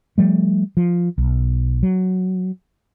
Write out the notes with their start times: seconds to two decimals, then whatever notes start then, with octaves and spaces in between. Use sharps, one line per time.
0.18 F3 G3 A3
0.77 F3
1.18 B1
1.83 F#3